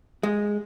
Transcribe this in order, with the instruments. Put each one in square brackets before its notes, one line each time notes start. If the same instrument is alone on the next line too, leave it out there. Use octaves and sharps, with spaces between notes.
[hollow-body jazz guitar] G#3